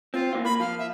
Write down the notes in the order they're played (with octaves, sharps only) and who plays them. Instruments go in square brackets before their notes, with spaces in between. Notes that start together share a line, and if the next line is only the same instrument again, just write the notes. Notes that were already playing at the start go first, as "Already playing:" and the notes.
[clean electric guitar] C4 [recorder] F4
[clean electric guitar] E3 A#3 F4
[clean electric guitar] A#3 [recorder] B5
[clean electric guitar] F3 [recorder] F5
[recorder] E5